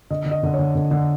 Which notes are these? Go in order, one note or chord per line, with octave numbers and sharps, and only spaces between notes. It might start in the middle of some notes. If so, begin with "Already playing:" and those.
D3 D#5
D3
D#5
D3
C#5
D3
D3
D3